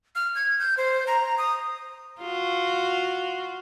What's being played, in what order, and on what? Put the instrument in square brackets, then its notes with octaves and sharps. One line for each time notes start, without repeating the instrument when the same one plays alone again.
[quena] F6
G#6
G6
C5
A#5
D#6
[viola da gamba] F4 F#4